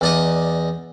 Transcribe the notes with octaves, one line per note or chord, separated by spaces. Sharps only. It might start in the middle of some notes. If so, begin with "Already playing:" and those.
E2 D5 D#5